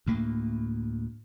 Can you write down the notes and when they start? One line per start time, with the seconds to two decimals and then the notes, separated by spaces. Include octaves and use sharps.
0.06 D2 A2 A#3